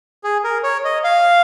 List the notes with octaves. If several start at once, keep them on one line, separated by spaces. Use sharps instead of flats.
G#4
A#4
C#5
D#5
F5